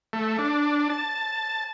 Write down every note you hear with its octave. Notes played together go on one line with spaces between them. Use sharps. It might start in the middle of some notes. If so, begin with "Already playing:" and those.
A3
D4
A5